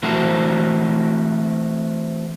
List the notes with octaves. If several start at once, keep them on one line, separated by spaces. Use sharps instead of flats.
E3 A3 C4 F#4 A#4 C5